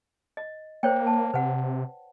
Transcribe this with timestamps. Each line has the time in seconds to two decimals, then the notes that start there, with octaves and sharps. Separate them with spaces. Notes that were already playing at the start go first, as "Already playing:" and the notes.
0.37 D#5
0.83 A#3 C5 C#5 G5
1.06 A5
1.34 C3 B4 F#5